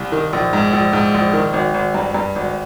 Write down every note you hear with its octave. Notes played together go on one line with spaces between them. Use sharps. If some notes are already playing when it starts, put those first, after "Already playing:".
Already playing: C2
D#3
A#1
G#2
A#1
G#2
A#1
D#3
G#1
G#1
G2
G2
G#1